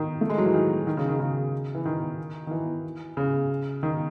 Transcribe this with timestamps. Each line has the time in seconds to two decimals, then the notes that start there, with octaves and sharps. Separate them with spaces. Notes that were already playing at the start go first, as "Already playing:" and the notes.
Already playing: D#3
0.21 A3
0.30 G#3
0.38 F#3
0.46 E3
0.54 D#3
0.87 D#3
0.97 C#3
1.09 D#3
1.20 C#3
1.75 E3
1.85 D#3
2.47 D#3
2.51 E3
3.17 C#3
3.83 D#3